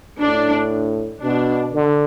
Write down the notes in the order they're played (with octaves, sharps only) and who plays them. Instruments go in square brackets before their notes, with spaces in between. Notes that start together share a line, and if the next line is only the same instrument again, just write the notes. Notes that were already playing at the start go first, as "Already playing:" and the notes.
[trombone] A2 [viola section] D4
[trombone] B2 [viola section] D4
[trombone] D3